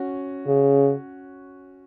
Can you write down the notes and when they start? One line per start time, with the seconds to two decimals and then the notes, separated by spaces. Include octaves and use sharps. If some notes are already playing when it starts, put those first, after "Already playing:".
Already playing: C#4 F#4
0.47 C#3